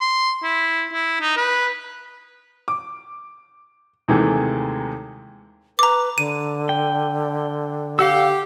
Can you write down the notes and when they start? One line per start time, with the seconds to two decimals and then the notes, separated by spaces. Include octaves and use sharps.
0.01 C6
0.43 E4
0.93 E4
1.21 D#4
1.37 B4
2.68 D6
4.08 D#2 C3 D#3 E3 G#3 A3
5.79 B4 A#5 D6
6.18 D3 D#7
6.69 G5
7.99 G4 F5 F#5 E6